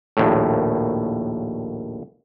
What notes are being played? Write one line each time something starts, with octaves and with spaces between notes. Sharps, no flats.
A#1 D#2 A2